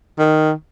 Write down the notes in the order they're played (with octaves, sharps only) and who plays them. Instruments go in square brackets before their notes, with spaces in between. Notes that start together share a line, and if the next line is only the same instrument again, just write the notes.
[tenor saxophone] D#3